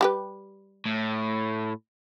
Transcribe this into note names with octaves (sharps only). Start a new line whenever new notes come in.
G3 G4 B4
A2